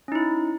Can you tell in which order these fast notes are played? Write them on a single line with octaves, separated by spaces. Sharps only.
C#4 D#4 E4